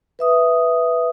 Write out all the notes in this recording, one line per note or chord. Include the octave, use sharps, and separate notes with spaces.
B4 E5 D#6